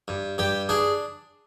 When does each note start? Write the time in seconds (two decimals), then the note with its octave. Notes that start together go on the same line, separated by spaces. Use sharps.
0.08 G2
0.38 G2 G4
0.69 D4 G#4